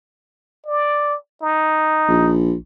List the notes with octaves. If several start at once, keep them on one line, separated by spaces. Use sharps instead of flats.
D5
D#4
A#1